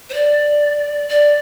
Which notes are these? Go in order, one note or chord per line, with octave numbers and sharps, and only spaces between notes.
C5
D5
D5